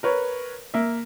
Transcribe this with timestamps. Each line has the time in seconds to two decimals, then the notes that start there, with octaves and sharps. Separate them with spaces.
0.03 A#4 B4 C#5
0.74 A#3 E5